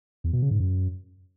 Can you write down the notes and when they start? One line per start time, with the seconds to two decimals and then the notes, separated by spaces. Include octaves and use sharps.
0.24 E2
0.33 B2
0.42 C#3
0.51 G#2
0.60 F#2